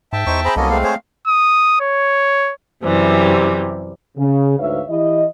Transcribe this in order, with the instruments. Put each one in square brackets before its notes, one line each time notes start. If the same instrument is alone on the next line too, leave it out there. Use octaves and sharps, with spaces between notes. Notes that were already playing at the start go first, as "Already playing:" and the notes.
[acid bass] G#2 [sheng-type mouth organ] E5 G5 A5
[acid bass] E2 [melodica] D#4 C5 C#6
[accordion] C4 C5 B5 [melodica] G#4 A#5
[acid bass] C2 [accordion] F#3 D#5 [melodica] A#3 B3 A4 [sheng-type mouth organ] C#4
[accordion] G#3 A3 C4 [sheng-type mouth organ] F5
[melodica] G#4 C5 C#5
[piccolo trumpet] D#6
C#5
[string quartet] F#2 C3 E3 G3
[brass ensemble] C#3
D2 G#2 B4 C#5 E5 F5
E3 E4 G4 D#5